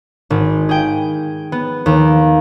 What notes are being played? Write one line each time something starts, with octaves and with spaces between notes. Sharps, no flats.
G#1
G#4 G5
B3
D#2